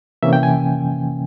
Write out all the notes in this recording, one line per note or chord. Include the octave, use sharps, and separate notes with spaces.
C3 E3 A#3 C#4 E5
G5
G#5